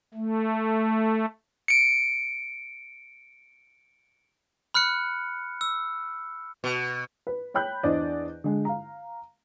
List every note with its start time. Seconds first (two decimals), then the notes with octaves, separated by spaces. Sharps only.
0.14 A3
1.68 C#7 D7
4.74 B5 F6 F#6 C#7
5.61 E6
6.64 B2
7.27 B4
7.54 C#5 G5 B5 F#6 G6
7.83 E2 D4 C5 D5 D#5
8.44 D3 G#3
8.65 F5 A#5